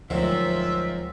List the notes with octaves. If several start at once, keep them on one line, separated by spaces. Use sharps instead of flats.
D2 G#2 D#3 F3 F#3 C4 F4 E5